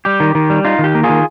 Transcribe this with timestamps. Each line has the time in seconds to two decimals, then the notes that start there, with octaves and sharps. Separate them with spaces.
0.05 G3 G4
0.20 D#3
0.35 D#3
0.50 G3
0.65 D#4 F4
0.79 D#3
0.84 G4
0.95 A#3
1.03 F4 G#4
1.09 D#3